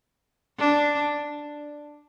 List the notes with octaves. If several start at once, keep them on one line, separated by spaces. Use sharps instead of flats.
D4